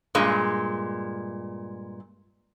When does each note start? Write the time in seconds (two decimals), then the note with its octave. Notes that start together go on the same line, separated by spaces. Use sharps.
0.15 G2 A#2 G#3